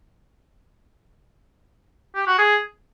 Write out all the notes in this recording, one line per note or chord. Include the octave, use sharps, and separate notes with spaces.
G4
F#4
G#4